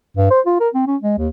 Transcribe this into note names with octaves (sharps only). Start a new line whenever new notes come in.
G2
C5
F4
A#4
C4
C#4
G#3
D#2